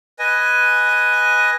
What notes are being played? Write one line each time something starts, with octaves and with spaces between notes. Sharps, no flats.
B4 D#5 G#5